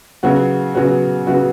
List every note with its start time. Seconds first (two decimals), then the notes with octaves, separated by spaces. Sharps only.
0.23 C#3 F#3 B3 F#4
0.74 C#3 F#3 B3 F#4
1.27 C#3 F#3 B3 F#4